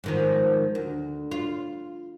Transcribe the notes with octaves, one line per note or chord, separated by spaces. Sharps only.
G#2 D#3 F3
D2
F4